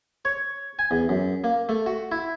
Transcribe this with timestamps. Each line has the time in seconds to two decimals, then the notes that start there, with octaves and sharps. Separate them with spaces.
0.25 C#5
0.79 G#5
0.91 E2
1.09 F#2
1.44 A#3
1.69 A3
1.86 F#4
2.12 E4